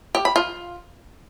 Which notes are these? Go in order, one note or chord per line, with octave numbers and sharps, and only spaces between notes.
G4
B5
F4